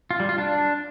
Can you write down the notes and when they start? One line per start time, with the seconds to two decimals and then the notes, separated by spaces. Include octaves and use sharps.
0.11 F4
0.20 G3
0.29 F4
0.38 D4